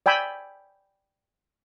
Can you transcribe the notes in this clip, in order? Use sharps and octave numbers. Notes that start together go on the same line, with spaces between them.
D5 G5 G#5 B5 E6